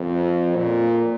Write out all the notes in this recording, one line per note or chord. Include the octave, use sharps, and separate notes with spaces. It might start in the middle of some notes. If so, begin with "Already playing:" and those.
Already playing: F2
A#2